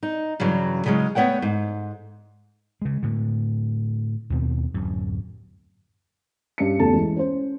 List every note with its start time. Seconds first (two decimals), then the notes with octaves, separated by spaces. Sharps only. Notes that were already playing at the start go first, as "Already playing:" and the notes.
0.03 D#4
0.40 G2 C#3 E3 F#3
0.86 C#3 F#3 G#3 C#4
1.15 A3 B3 C#5 F#5 G5
1.42 G#2
2.82 C#3 G#3
3.03 A2 D3
4.30 D#2 B2 C4
4.74 D1 F#2
6.58 G2 C#4 C#7
6.79 F#1 E2 A3 A4 A5
6.93 E3 G#3
7.17 C#4 C5